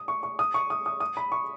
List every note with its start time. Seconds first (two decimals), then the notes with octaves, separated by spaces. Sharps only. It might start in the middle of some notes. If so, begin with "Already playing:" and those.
Already playing: D#6
0.08 C#6
0.23 C#6
0.39 D#6
0.54 C#6
0.70 D#6
0.86 D#6
1.00 D#6
1.17 B5
1.32 C#6